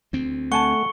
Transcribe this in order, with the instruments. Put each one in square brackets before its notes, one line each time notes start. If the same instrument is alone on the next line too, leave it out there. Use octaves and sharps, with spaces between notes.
[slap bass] D2 C4
[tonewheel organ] A3 [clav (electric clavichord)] F#5 G#5 A5 [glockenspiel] C#6 C#7 G7